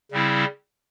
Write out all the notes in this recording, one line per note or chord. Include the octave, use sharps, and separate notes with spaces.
C#3 G3 C4 E4